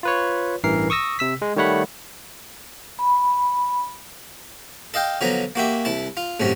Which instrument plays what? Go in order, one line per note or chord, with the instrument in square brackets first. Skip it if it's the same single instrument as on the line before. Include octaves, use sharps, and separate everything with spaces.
[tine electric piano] F4 B4 C#5
A1 G2 E3 A#4 C7
C#6 D#6 E6 A#6
C3 E6 B6
G#3
D#3 G3 A3 C#5 F#5 B5
[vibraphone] B5
[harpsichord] A4 D#5 F5 G5
D3 F3 F#3 B3 A#5
A#3 F#4 G4 E5
C2 E4 A5
F4
A1 G2 C3 F#3 C#4